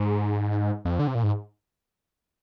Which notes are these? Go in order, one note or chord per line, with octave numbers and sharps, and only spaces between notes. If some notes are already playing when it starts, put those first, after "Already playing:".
Already playing: G#2
F2
D3
C3
A#2
G#2